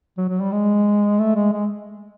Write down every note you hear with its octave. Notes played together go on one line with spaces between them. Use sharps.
F#3
F#3
G3
G#3
A3
G#3
G#3